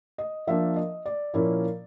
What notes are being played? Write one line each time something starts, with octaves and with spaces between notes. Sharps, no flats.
D#5
F3 A#3 D4 E5
D#5
D5
A#2 F3 A#3 C#4 E4